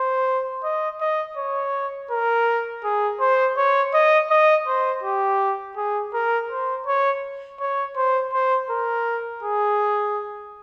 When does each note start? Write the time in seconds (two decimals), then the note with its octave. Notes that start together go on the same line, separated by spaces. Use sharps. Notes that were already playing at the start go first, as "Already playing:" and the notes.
Already playing: C5
0.64 D#5
1.01 D#5
1.37 C#5
2.11 A#4
2.84 G#4
3.21 C5
3.57 C#5
3.94 D#5
4.30 D#5
4.67 C5
5.04 G4
5.77 G#4
6.13 A#4
6.50 C5
6.87 C#5
7.60 C#5
7.96 C5
8.33 C5
8.70 A#4
9.43 G#4